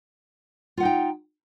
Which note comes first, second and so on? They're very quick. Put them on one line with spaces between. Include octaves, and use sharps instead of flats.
F4 F#5 D#4 G5